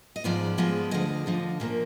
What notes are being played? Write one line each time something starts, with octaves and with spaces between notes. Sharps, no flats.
D#5
G#2 F3 G#3 B3 D5
G#2 F3 G#3 B3
D2 D3 F3 D#5
D2 D3 F3
A#2 F3 A#3